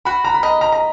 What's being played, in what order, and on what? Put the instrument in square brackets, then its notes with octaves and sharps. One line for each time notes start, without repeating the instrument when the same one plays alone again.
[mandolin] F#4 [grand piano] B5
[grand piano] A#5
B5
[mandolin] D#5 [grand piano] A#5
[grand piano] A#5
A#5